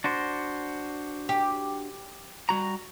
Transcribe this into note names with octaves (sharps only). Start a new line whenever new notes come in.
D4 F#4 C5
G4
G3 F#4 A#5